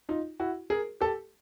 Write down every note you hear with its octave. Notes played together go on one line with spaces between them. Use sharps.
D#4 F4
E4 F#4
G#4 A#4
G4 A4